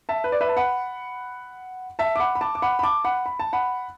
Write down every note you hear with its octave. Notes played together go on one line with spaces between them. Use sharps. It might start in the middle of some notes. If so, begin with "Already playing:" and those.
E5 A5
B4
D5
B4 E5
A5
F#5 B5
E5 A5
D6
F#5 B5
B5
A5 D6
D6
F#5 B5
B5
A5 D6
F#5 B5
B5
A5
F#5 B5